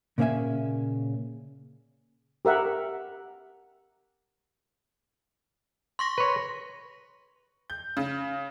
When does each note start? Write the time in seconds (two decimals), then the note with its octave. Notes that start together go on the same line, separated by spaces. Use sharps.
0.18 A#2 C#3 A#3 C#4 E5 G#5
2.45 G4 A#4 E5 F#5
5.99 C6 C#6 A#6
6.18 B4 C#5
7.70 G6
7.97 C#3